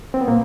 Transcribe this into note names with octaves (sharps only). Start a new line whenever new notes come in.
C4
B3
A#2 A#3